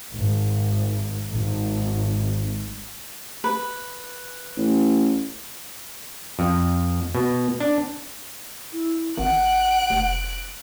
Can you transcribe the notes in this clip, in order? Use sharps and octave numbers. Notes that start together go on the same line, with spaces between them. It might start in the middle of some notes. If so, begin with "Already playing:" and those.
G#1
G#1
B4
A1
F2
B2
D4
E4
G#1 F#5 F#6 D7
F1